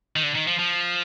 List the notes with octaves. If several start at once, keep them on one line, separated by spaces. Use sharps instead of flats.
D#3
D3
D#3
F3
F3